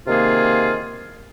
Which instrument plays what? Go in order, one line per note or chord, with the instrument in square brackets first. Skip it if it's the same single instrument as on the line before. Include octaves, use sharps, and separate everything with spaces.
[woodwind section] C3 D#3 A#3 F4 G#4